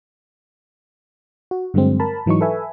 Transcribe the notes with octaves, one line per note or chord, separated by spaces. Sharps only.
F#4
G2 D3 F#3 G#3 C4
A#4 A5 B5
G#2 E3 F#3 D#4 C#6
A4 B4 E5 G#5